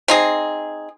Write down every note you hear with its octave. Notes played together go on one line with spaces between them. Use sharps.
C4 D#4 G#4